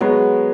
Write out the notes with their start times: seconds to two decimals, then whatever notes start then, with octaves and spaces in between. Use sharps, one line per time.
0.01 F#3 G#3 B3